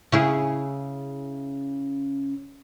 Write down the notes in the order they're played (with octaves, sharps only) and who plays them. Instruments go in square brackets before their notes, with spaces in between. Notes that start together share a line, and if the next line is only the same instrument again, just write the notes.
[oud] C#3 E4 G#4